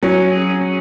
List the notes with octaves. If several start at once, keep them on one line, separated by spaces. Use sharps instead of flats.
F#3 C#4
G#4
C#4